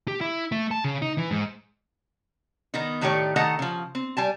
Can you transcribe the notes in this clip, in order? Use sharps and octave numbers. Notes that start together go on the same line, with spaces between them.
G4
E4
A3
A5
C#3
D#4
E3
G#2
D#3 B3 D#4
A2 D#3 A3 G4 C#5 D5
D#3 A3 A4 D#5 F#5 A#5
C#3 F3
C4
G3 G#5 A5